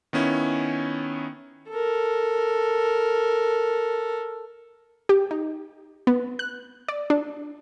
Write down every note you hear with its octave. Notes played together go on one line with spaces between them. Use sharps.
D#3 B3 C#4 E4
A4 A#4
G4
D#4
B3
F#6
D5
D4